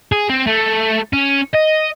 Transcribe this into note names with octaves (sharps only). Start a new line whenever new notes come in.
G#4
C4
A3
C#4
D#5